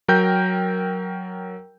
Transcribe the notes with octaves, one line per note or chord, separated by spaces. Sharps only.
F#3 A#4 G5 G6